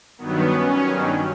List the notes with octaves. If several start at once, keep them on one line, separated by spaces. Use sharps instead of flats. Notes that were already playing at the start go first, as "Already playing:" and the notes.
G2 D#3 F#3 B3
C#4
G2 D#3 F#3